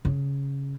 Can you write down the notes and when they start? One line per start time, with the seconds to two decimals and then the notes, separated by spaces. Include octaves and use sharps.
0.05 C#3